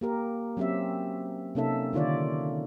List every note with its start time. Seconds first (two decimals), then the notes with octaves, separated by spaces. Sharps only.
0.01 A#3 G4 A#4
0.57 F#3 C4 C#4 G4 E5
1.55 C3 A#3 C#4 D#4 A4 E5
1.93 D3 D#3 F4 C#5 D5